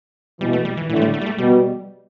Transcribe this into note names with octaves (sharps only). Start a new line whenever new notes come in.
B2 E3 G3
A3
G3
E3
A2 D3 E3
A3
G3
A3
G3
A3
B2 G3